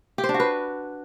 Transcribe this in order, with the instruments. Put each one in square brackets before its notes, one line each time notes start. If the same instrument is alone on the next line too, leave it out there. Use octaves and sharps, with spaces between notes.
[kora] G4
C5
D4
F#4
B4